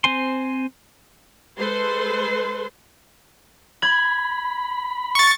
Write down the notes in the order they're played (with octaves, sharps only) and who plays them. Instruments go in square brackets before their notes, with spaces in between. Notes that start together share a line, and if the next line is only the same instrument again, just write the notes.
[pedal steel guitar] C4 C5 G#5 C6
[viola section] G#3 A4 B4 C5 C6
[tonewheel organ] B5 [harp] G#6
[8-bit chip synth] C#6 A6